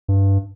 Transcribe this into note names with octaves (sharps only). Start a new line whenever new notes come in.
G2